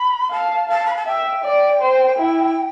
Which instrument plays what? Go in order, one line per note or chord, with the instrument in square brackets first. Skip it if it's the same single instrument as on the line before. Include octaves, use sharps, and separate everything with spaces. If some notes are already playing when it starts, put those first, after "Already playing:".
Already playing: [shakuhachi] B5
[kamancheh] F5 [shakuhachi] A5
[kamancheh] F5 [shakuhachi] A5
[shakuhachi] B5
A5
[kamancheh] E5 [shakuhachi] G5
[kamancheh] D5
C5
E4